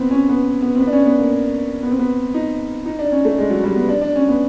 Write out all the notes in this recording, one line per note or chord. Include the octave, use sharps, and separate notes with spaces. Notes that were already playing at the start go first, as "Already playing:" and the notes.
Already playing: B3 C4
C#4
B3
B3
C4
B3
D4
C#4
B3
A#3
B3
C4
B3
D#4
D#4
D4
C#4
A3
G#3
F#3
G3
B3
D4
D4
C#4
B3